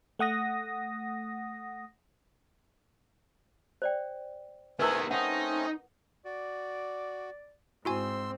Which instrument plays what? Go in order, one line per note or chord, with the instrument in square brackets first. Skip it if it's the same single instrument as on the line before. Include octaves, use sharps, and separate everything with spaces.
[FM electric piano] A3 F#5 D#6 A#6
[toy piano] C5 D5 G5
[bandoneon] C3 A3 G#5 [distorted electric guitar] D#3 B3 [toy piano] E4 A#4 B4
[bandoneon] A3 C4 C#4 [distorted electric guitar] D#4 [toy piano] F#5
[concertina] F#4 [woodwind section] D5
[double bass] G#2 C4 [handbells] E4 F#4 G#5 [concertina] C6 E6